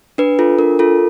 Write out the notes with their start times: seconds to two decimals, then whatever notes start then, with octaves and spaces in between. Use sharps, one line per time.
0.18 D4 B4
0.39 F4 A4
0.59 D4 A#4
0.79 F4 A4